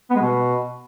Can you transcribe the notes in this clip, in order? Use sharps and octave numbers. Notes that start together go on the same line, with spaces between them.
B3
G#3
B2